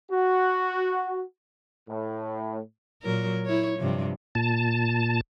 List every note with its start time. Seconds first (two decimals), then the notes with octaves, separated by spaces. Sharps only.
0.10 F#4
1.88 A2
3.03 A#2 F#3 A#4
3.45 E4 C#5
3.79 G2 C3 F3
4.35 A#2 A5